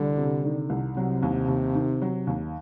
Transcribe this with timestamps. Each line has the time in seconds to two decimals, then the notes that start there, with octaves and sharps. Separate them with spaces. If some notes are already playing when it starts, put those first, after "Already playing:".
Already playing: C2 D3 G3
0.17 C3
0.45 D#3
0.70 C2
0.96 C3 F#3
1.23 D#2
1.48 D#2
1.75 D#3
2.02 F#3
2.27 D#2